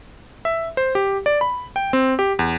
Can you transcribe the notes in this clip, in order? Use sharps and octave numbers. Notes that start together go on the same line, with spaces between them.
E5
C5
G4
D5
B5
G5
C4
G4
E2